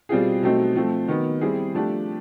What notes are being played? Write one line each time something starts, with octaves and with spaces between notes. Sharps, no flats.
B2 G3 C4 F4 G#4
B2 F#3 A3 C4 D#4
F3 A3 C4
D#3 F#3 B3
G3 C4 E4 G#4
F3 A3 D4 G4